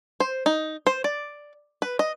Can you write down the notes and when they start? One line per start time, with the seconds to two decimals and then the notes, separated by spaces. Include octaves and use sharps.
0.20 C5
0.46 D#4
0.87 C5
1.04 D5
1.82 B4
1.99 D#5